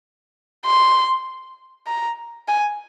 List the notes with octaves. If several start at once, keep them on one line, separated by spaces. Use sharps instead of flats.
C6
A#5
G#5